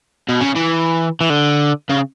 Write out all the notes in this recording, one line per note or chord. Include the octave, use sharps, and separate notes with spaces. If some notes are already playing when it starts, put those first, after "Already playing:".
B2
C#3
E3
E3
D3
C#3